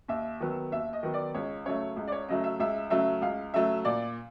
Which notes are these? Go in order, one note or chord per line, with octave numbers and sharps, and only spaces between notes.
D#2 E5
D#3 F#3 B3
D#2 E5
D#5
D#3 F#3 B3
D5
C#2 C#5
C#3 F#3 A3 C#5
C#2
D5
C#5
C#3 F#3 A3 D#5
E5
C#2 E5
C#3 F#3 A3 E5
C#2 F5
C#3 F#3 A3 E5
A#2 D5